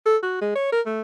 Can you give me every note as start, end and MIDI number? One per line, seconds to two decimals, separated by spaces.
0.06 0.17 69
0.23 0.39 66
0.41 0.52 56
0.55 0.67 73
0.72 0.81 70
0.86 1.01 57